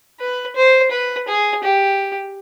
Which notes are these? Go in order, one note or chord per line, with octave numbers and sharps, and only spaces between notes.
B4
C5
B4
G#4
G4